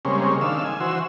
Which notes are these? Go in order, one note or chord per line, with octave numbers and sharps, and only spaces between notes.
C#3 G3 G#3 A#3 C4 C#4
D#3 D4 F5 E6
G#5
E3 F#4 C5 E6